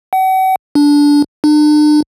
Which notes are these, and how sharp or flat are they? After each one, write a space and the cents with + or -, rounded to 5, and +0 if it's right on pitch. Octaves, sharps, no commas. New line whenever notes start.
F#5 +40
D4 -15
D4 +40